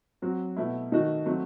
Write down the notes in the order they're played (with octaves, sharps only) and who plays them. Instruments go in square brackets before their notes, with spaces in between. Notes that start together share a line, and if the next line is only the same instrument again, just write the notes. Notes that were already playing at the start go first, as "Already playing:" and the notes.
[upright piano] F#3 C4 F#4
B2 A3 E4
D#3 A3 D#4 F#4
F#3 A3 C4 F#4